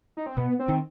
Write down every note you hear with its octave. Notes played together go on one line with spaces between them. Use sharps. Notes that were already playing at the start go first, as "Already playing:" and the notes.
D#4
C4
B2 B3
C4
D#3